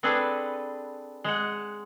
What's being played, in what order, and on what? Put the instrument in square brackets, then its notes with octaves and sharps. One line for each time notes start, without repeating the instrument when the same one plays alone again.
[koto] C4 D4 G#4 A4 B4
G#3 F#5